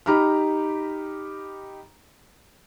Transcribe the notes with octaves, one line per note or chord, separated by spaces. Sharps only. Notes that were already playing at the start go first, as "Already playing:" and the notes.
D#4 G4 A#5 B5 F6